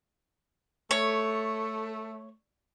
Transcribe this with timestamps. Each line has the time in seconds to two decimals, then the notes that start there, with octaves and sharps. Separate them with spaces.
0.91 A3 C#5